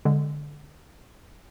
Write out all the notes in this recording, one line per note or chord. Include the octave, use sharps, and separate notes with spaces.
D3 G#3